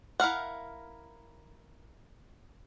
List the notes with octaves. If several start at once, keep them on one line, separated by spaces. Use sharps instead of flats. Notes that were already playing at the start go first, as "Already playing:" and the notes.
E4 A#4 F5 F#5